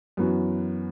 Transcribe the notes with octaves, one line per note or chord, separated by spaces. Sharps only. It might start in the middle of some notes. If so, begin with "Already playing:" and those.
F#2 E3 B3 F#4